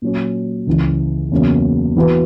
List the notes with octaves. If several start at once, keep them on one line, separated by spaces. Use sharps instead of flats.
A#2 F#3 C#4
C#2 C#3 E3
E2 C#3 F#3 A#3 C#4
E3 B3 F#4 B4